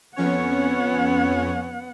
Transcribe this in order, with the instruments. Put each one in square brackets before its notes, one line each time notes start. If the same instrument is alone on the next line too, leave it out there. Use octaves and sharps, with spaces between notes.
[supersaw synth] F2 C#4 C#5 [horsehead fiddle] B3 F#5